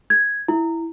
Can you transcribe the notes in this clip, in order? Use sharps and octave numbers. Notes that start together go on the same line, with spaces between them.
G#6
E4